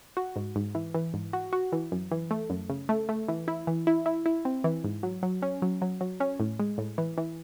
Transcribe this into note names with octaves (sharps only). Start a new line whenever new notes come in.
F#4
G#2
G#2
E3
E3
G#2
F#4
F#4
E3
F#2
E3
A3
F#2
C#3
A3
A3
E3
E4
E3
E4
E4
E4
C4
E3
G#2
F#3
F#3
C#4
F#3
F#3
F#3
C#4
A2
G#3
A2
E3
E3